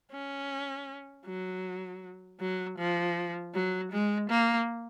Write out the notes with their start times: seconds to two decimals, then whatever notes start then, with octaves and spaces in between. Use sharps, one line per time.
0.12 C#4
1.26 F#3
2.40 F#3
2.78 F3
3.54 F#3
3.91 G#3
4.30 A#3